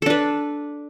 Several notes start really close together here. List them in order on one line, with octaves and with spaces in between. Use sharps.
A4 D4 B4